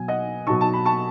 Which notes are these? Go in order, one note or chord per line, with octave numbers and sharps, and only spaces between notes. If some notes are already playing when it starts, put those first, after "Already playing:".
Already playing: B2 F#3 G#5
D#5 F#5
B2 F#3 A5 C#6
A5
B5
A5 C#6